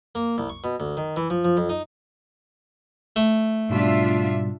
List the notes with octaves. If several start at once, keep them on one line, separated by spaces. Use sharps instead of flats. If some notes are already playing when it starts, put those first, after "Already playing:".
A#3
C2
C#6
B2
D2
D#3
E3
F3
F3
F2
D#4
A3
G#2 B2 G3 D4 F4 E5